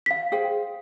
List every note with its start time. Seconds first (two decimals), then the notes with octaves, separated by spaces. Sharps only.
0.06 F5 B6
0.32 G#4 C5 G5